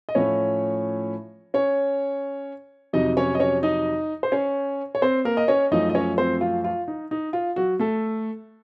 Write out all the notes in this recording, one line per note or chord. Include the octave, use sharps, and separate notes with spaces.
D#5
A2 F3 A3 C#4 C#5
C#4 C#5
F2 C3 F#3 D#4 D#5
C#4 C#5
D#5
C#4 C#5
D#4 D#5
C5
C#4 C#5
C#5
C4 C5
A#3 A#4
D#5
C#4 C#5
F#2 F3 A3 D#4 D#5
D#5
C#4 C#5
C4 C5
F4
F4
D#4
D#4
F4
F#3 F#4
A3 A4